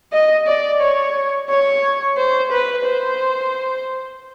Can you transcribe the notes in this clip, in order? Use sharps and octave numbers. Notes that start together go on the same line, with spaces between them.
D#5
D5
C#5
C#5
C5
B4
C5